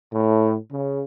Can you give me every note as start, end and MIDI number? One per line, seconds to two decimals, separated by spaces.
0.13 0.55 45
0.71 1.04 49